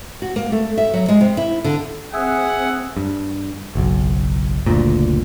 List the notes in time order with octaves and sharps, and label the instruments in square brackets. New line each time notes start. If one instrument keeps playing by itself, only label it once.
[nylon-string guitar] F#4
A#3
A3
E5
F#3
G#3
C3
E4
D3
[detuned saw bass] C4 [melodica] G#4 E5 G#5 [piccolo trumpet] F#5
[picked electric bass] G2
F#1 B1
F#1 D2 A#2